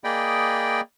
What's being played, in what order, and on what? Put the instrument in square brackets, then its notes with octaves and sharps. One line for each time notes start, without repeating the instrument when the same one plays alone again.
[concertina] A#3 G#4 D5 D#5 G5 B5